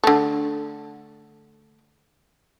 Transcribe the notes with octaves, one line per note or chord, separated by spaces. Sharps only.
D3 A3